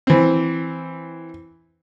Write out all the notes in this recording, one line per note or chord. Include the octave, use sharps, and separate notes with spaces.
E3 C4